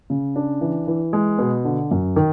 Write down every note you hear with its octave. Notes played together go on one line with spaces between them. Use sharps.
C#3
D4
E3
E3
G#3
B2
D3
F#2
D#3